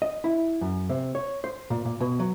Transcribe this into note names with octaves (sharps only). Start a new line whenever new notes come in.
D#5
E4
F#2
C3
C#5
C5
A#2
A#2
B2
F#3